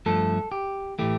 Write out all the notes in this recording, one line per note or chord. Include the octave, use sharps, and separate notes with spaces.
G2 F3 A3 A4
G4
A2 E3 A3 G4